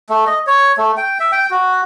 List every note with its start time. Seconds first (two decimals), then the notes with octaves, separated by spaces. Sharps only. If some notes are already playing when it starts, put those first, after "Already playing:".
0.10 A3
0.27 D#5
0.47 C#5
0.78 A3
0.97 G5
1.20 E5
1.32 G5
1.51 F#4